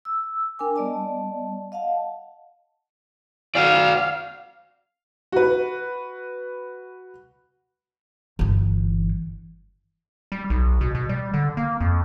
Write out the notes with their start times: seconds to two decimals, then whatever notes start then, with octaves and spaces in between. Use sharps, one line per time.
0.05 E6
0.59 D4 A#4 G5 G#5 D6
0.76 G3 B3 D5 D#5 A5
1.72 D#5 F5 F#5 A5
3.55 F#4 D5 F5
5.32 F#4 B4
8.39 G1 E3
10.32 G3
10.50 B1
10.81 B2
10.95 B2
11.09 G3
11.33 D3
11.57 A#3
11.81 F2